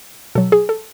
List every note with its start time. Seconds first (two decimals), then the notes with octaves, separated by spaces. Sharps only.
0.35 B2 F#3 A4
0.52 G#4
0.69 A4